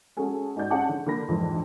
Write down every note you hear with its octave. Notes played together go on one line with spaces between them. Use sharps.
G#3 C#4 F#4 G#4 A4 G#5
G#2 D#4 F#4 D5 G6
G#3 C#4 G#4 F#5 A5 D6
D3
D3 A#3 A#4 B5 A#6
A#1 F2 G#2 D3 E3